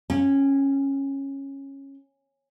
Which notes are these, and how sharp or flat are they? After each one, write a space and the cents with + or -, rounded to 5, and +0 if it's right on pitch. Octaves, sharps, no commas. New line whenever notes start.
C#4 -15 G5 +30